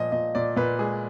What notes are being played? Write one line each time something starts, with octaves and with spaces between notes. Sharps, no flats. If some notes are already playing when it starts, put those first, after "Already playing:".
Already playing: A#2 F3 D#5
A#2 D#5
A#2 D5
A#2 B4
G#3 G#4